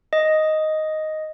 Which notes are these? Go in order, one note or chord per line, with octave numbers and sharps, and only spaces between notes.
D#5